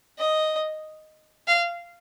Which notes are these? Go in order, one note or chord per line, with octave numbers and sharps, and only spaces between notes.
D#5
F5